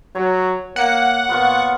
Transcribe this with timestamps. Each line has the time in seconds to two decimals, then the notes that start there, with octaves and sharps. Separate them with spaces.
0.15 F#3 C#5
0.76 A#3 F#5
1.29 A#2 B3 F4 C#6